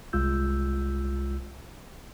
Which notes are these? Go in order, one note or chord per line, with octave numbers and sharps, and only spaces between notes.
C2 G#3 F4 E6 G6